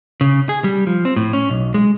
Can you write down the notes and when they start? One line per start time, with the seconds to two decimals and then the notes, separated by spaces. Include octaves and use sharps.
0.21 C#3
0.49 G#4
0.64 G3
0.87 F3
1.05 C4
1.16 A2
1.33 C#4
1.50 B1
1.74 G#3